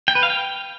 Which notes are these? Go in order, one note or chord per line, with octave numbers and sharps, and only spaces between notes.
G5
B4
F5
G5